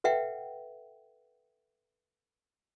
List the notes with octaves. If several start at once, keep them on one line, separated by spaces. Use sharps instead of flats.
A4 B4 E5 F#5 G5